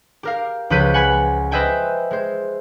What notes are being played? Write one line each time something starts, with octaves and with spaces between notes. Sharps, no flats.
G4 A#4 F5
C#2 F3 B4 G6 B6 D#7
F#5 G#5 B5 B6
B4 C5 D#5 E5 G5 G#5
G#3 C5